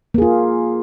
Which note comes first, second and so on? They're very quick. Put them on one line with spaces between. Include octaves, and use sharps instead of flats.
A#3 G#4 F4